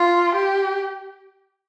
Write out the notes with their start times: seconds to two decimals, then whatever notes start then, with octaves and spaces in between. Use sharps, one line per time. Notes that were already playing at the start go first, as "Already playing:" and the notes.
Already playing: F4
0.35 G4